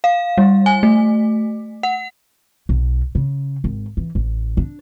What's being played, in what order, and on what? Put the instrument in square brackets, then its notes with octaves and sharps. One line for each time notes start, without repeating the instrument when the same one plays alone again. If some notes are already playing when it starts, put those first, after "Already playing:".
[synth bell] F5
G3
G#5
A3
F#5
[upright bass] B1
C#3
G#1
E3
A1
D4